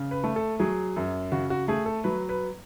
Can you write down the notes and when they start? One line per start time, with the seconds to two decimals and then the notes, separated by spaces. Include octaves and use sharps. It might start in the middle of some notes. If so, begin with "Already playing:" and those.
Already playing: C#3
0.11 B4
0.24 A3
0.36 A4
0.60 F#3 G#4
0.96 F#2
1.32 C#3 F#4
1.50 F#4
1.68 A3 G#4
1.86 A4
2.04 F#3 B4
2.29 B4